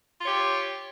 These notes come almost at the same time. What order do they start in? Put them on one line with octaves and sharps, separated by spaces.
F4 C#5 G4